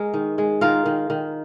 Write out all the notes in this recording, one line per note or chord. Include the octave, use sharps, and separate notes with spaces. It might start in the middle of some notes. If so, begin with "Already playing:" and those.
Already playing: G#3 A#4
D#3
G#3
D#3 F4 A#4
D#3
D#3